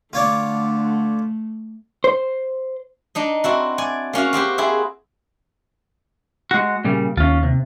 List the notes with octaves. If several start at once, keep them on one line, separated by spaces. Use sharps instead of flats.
D3 A3 F4 C#5 D5
C5
D4 D#4 D#5
C4 E4 F#4
D5 G#5
A#3 C#4 F#4 F5
C4 F#4 G4 C5
C4 E4 G#4
G#3 F#4
A#2 C#3 G3
D#2 C#4 F4
C3